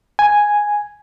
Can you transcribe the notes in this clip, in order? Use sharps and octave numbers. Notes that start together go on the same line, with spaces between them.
G#5